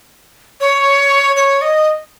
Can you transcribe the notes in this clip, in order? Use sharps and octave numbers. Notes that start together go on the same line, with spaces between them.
C#5
C#5
D#5